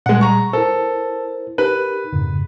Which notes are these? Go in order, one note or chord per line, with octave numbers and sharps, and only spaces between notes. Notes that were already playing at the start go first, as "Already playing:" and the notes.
A#2 G3 G#3 F#5
A#5 C#6
E4 A4 A#4 C5
D#4 G4 A#4 B4
F2 G#2 C#3